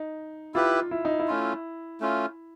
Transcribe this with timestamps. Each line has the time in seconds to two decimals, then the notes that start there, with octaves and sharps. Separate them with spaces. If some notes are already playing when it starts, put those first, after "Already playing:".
Already playing: D#4
0.54 E4 F4 G4 B4
0.91 E4
1.05 D#4
1.20 E4
1.28 A3 C#4 F4
2.00 A3 C#4 F4